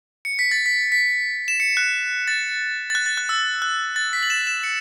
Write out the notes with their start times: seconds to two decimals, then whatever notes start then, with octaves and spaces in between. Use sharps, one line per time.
0.25 C#7
0.39 B6
0.51 A6
0.66 B6
0.92 B6
1.48 E7
1.60 C#7
1.77 F#6
2.28 A6
2.90 A6
2.95 F#6
3.06 A6
3.17 F#6
3.29 E6
3.62 F#6
3.96 A6
4.13 B6
4.23 F#7
4.30 E7
4.47 E7
4.64 C#7